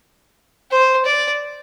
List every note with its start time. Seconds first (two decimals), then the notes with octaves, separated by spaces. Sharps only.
0.71 C5
1.05 D5